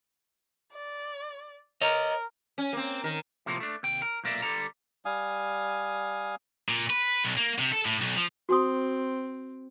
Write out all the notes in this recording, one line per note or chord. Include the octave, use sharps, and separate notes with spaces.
D5
A#4 C#5 D#5
C#4
A#3 C4
D#3 A#4
A2 C3 F3 A#3 C4
A3 D4
D#2 C3 G5
A#4
B1 A#2 A#3 A#4 D5 E5
D3 G3 A4 A#5
G3 F5 G#5 D#6
A#2
B4
B1
A#3
C3
A4
A2
B1
F3
C4 F#4 C6 D#6